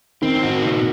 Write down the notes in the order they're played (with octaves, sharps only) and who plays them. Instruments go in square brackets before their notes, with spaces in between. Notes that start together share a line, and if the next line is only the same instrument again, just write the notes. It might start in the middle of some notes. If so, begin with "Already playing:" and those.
[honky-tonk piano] D#3 [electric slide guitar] C4
[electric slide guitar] F#4
A#2